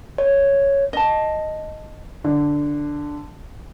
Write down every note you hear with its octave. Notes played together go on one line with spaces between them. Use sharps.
C#5
D#5 A5
D3